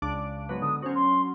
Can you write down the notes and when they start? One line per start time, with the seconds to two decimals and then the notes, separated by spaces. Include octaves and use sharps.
0.02 C#2 D4 D6
0.49 G#2 F#3 B3
0.62 D3 D#6
0.82 F#3 C#4 C5
0.95 C6